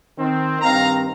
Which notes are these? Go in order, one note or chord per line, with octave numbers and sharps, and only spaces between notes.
D#3 C4
G2 D#3 C4 F5 A#5